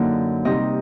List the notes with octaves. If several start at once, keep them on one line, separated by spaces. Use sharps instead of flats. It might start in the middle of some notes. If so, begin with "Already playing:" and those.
Already playing: F#2 D3 F#3 A#3 D#4 F#5
C3 G3 C4 D#4 D#5